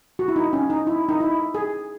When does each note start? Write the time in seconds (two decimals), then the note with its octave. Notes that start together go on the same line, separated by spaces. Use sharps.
0.19 F#4
0.28 E4
0.36 D#4
0.53 C#4
0.70 D#4
0.87 E4
1.09 D#4
1.20 E4
1.55 G#4